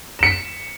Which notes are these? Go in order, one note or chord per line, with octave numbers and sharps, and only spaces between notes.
B6 C#7 E7